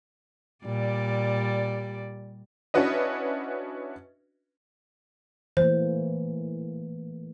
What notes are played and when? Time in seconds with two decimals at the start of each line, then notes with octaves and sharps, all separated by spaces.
0.65 A#2 G3 D5
2.74 C#4 D4 E4 F#4 B4 D#5
5.57 E3 A3 A#3 C5